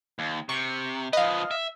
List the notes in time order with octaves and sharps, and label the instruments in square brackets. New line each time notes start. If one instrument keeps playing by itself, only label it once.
[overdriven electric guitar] D#2
[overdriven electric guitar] C3 [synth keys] C#6
[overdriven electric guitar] F3 B4 [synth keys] D#5 F5
[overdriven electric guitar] E5